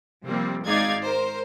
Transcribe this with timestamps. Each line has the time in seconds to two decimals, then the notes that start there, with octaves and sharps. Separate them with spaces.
0.25 C3 F3 G3 A#3 C4
0.66 G#1 G#3 D#4 D5 F5 G#6
1.05 A#4 C5